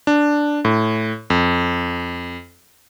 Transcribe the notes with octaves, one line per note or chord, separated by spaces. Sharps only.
D4
A2
F2